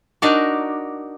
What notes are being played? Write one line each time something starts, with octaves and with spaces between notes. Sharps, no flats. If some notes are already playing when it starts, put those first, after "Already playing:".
D4 D#4 F#4 A#4 D5